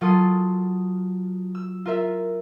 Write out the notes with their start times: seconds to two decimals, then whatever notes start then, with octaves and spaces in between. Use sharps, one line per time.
0.01 F#3 F4 A4 C6 D#6 C7
1.55 E6
1.85 F4 A#4 E5